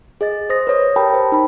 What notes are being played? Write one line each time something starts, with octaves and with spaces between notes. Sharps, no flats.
G#4 D#5 A6
C5 D#6 A#6
B4 C#5 D#6
G4 A#4 G5 A5 B5
A#4 C5
D#4 B5